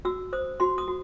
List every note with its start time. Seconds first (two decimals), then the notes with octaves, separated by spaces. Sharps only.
0.05 F#4 E6
0.33 C5 D#6
0.60 F#4 C6
0.78 D#6
0.88 F#4